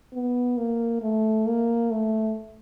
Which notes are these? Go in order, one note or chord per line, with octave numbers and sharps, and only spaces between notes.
B3
A#3
A3
A#3
A3